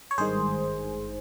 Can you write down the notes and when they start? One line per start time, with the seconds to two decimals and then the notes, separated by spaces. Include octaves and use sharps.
0.11 C#5
0.18 G#1 G2 D#3 G#3 G#4 C5